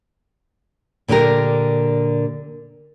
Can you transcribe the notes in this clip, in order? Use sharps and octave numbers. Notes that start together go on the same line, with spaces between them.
A#2 D3 D4 G4 A#4